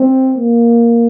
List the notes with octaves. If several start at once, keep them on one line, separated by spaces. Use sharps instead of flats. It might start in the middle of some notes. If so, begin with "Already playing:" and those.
Already playing: C4
A#3